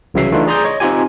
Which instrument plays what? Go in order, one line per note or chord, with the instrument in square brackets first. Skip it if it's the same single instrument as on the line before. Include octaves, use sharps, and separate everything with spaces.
[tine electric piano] C2 C#3 E3 F#3 E5 C7
E3 A3 D4 D#4 F4
G#4 D5 A#5 C6 D#6 G6
C#5 D#5 C#6
C4 D#4 F4 G4 G#5